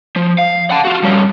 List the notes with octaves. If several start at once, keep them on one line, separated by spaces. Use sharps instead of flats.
F3
F5
F#5 A5
F4 F#4
G2 C#4